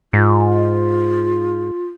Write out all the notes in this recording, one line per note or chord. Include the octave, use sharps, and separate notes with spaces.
G#2 F4